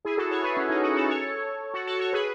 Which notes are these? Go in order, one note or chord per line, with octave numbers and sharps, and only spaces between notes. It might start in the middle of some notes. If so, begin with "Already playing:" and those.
E4 G#4
F#4 A4
A4 C#5
G#4 B4
C#4
D#4
D#4 F#4
F#4 A4
A4 C#5
F#4 A4
F#4 A4
A4 C#5
G#4 B4